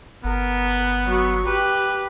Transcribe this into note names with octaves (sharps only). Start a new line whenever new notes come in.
G1 B3 A#4
F#3 C#6
G4 B4